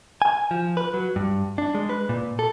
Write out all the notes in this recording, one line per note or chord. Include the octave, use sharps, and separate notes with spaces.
G#5
F3
B4
F#3
G2
D4
G#3
B4
A#2
A4